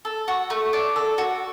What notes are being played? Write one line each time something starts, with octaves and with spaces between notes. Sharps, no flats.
A4
F#4
A3
D4
A4
F#4